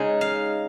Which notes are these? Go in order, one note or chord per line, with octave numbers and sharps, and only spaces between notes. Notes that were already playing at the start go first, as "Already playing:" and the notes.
Already playing: C#3 G#3 C#4 D#4
F5